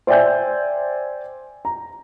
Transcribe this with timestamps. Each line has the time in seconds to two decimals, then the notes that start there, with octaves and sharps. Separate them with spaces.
0.07 C5 D5 E5 G5 G#5 G6
1.65 A#5